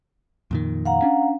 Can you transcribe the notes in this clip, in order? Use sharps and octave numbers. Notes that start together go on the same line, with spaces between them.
F2 A#2 D#3
F5 F#5 A#5
C#4 D4